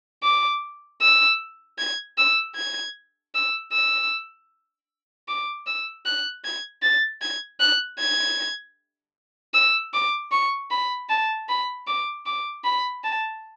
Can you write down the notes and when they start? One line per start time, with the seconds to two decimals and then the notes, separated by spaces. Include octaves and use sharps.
0.23 D6
1.02 E6
1.78 G#6
2.18 E6
2.56 G#6
3.34 E6
3.72 E6
5.28 D6
5.66 E6
6.05 F#6
6.45 G#6
6.82 A6
7.22 G#6
7.60 F#6
7.99 G#6
9.54 E6
9.94 D6
10.32 C#6
10.71 B5
11.09 A5
11.49 B5
11.87 D6
12.26 D6
12.65 B5
13.04 A5